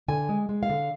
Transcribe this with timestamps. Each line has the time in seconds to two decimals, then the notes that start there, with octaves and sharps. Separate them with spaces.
0.08 D3 G#5
0.29 G#3
0.49 G#3
0.63 F5
0.69 D3